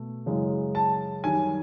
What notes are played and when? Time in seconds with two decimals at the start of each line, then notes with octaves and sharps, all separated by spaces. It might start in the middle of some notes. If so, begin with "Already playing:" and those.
Already playing: B2 A3
0.26 F#2 C#3 E3 G#3
0.75 A5
1.24 F#2 D#3 G3 G#5